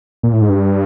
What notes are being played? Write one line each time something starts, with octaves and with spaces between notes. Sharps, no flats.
A#2
A2
G#2
G2